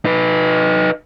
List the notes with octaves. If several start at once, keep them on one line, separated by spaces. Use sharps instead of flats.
D#4 B4